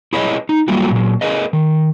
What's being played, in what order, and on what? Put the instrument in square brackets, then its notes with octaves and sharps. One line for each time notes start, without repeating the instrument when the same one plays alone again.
[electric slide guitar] E4 G#4 B4 C#5 D#5
D#4
F#3 G3 A3 A#3 F4 F#4
A#2 F#3
G#4 A#4 B4 D#5
D#3